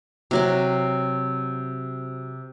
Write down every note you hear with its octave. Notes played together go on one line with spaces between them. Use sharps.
C3 F#3 C4